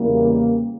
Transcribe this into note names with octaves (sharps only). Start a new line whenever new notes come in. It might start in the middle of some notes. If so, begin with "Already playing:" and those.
Already playing: E2 C#3 E3 G3 A#3